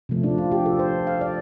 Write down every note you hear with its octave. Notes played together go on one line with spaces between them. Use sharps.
C3 F3 A3
D4
F4
G4
A4
C5
F5
D5